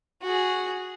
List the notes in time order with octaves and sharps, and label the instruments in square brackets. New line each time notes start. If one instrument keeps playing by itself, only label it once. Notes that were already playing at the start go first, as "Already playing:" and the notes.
[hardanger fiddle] F#4 G#4